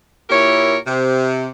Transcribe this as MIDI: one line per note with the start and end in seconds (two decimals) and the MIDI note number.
0.30 0.77 46
0.30 0.77 64
0.30 0.77 67
0.30 0.77 70
0.30 0.77 73
0.86 1.49 48